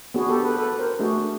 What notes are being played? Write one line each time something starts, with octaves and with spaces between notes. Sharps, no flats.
B3 D4 F#4 G#4
G4 A4
A4 B4
A4 B4
A#4 C5
A3 D4 F#4 G#4